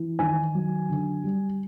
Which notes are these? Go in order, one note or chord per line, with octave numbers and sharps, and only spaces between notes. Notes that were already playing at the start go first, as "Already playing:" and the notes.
Already playing: E3
D#3 G#5
F#3
D3
G3